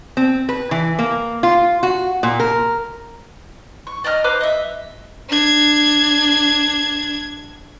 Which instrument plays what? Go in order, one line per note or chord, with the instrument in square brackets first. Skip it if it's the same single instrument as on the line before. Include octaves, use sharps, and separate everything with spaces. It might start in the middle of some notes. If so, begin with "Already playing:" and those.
[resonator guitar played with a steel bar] C4
B4
E3
A#3
F4
F#4
A#2
A#4
[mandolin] C#6
D5 D#5 A#5 F6
B4 C5 A#5 D6
D#5 E5
[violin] D4 G#6